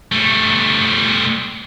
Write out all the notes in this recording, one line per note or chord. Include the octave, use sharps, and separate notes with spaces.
G3 A3